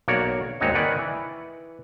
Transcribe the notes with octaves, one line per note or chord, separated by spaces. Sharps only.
B1 A#3 F#4 C#5 D5
D#2 G#2 C4 F#4 C#5 D#5
D#3 B4 D5 F#5 G#5
E3